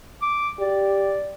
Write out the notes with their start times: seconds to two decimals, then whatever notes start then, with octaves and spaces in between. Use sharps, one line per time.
0.22 D6
0.59 G4 D5